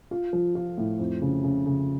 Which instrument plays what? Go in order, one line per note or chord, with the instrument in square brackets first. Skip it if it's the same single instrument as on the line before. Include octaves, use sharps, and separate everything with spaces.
[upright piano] F4
F3
F4
A2
F2
C#3
C#3
C#3